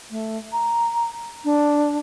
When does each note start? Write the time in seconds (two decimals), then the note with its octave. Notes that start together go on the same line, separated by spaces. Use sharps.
0.10 A3
0.53 A#5
1.44 D4